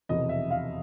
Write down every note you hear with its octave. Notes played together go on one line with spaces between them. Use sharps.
F1 E2 B2 D#5
E5
F5